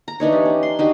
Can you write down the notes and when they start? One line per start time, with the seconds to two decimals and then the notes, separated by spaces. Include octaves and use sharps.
0.08 A#5
0.20 E3 D4 D#4 C#5
0.32 G4
0.45 C#4
0.63 C6
0.79 D4 D#4 F#4 G4